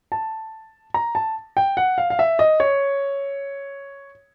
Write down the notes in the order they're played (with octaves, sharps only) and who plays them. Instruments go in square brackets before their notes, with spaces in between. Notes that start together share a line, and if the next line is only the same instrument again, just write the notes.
[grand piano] A5
A#5
A5
G5
F#5
F5
F5
E5
D#5
C#5